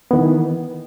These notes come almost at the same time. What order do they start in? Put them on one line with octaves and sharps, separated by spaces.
B3 D#3 E3